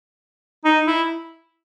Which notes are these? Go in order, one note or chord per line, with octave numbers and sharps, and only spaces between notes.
D#4
E4